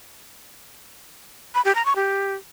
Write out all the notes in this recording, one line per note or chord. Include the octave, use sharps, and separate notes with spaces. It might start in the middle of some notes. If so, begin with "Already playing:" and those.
B5
G4
A#5
C#6
G4